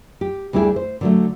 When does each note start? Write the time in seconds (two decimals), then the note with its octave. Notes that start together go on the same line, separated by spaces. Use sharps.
0.21 G4
0.53 D2 G3 D4 E4 G#4
0.76 C5
1.01 D3 F#3 A3